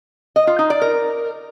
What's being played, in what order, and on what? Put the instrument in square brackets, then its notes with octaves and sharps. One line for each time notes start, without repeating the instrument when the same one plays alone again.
[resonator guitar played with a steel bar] D#5
F4
D#4
D5
A#4